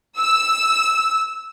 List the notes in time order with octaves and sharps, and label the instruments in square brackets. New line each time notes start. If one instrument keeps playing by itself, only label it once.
[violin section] E6